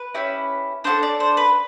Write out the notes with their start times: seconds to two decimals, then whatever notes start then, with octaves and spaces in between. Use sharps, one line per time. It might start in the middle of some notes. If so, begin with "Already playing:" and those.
Already playing: B4
0.15 C#4 E4 G4
0.84 D4 F#4 A4 C5
1.03 D5
1.20 C5
1.37 B4